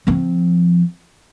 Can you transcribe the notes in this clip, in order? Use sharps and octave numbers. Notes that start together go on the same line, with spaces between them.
F3 C4